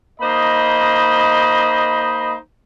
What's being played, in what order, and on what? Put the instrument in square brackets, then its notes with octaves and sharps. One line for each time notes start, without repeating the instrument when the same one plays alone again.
[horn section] A#3 D#4 C5 D#5 B5